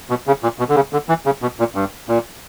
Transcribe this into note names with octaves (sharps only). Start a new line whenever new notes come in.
B2
C#3
A#2
B2
D3
C#3
D3
E3
C#3
B2
A#2
G2
A#2